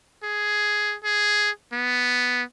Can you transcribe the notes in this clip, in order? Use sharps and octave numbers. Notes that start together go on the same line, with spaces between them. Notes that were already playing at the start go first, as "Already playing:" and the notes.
G#4
G#4
B3